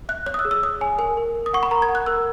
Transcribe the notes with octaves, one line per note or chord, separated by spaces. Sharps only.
E5 F#6
C#5 F#6
D#6
E6
G#4
E6
C#5 D#6
C#5 G#5
A#4 G#5
A#4
A#4
D#6
F#5 C#6
B5
A#4 A#5
G#6
F#5
F#6
A#4 E6